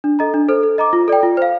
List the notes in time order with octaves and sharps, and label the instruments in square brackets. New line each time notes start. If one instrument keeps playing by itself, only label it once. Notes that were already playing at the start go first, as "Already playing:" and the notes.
[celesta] D4
A4 D#5 A#5
D4
A4 C5
A4
D#5 A#5 D6
F4
A4 D5 G5
F4
C5 F5